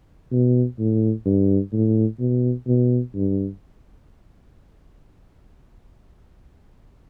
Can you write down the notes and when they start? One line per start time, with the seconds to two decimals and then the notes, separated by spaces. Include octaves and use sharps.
0.32 B2
0.79 A2
1.26 G2
1.73 A2
2.20 B2
2.67 B2
3.15 G2